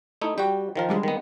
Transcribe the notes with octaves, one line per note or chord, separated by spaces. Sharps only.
A3 D#4 E4
G3 F#4 G5
D#3 F3 A#4
D3 G3 G#3
D#3 B3